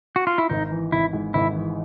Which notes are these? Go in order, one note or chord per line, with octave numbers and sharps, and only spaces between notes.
F#4
F4
E4
G#1 D#4
E3
G#1 E4
G#2
G#1 E4
E3